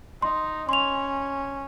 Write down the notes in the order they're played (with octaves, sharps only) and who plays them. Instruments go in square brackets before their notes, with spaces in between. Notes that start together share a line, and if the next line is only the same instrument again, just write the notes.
[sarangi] D#4 [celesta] C6
[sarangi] C#4 [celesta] C6 F7